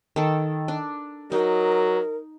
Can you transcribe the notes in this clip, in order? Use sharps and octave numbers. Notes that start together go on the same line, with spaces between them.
D#3 A4
D4
F#3 D#4 A#4